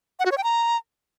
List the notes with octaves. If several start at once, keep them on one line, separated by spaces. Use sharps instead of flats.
F#5
F#4
C#5
G5
A#5